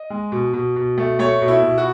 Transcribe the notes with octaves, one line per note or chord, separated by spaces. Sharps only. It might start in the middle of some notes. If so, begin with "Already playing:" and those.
Already playing: D#5
G#3
B2
B2
B2
A3
A3 C#5
B2
E4
B2
F#4